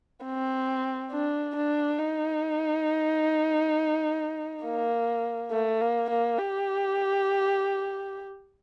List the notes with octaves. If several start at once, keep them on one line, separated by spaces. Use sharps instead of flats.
C4
D4
D4
D#4
A#3
A3
A#3
A#3
G4